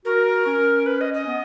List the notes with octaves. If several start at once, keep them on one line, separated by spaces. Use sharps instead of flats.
F#4 A#4
C#4
B4
D#5
D#5
B3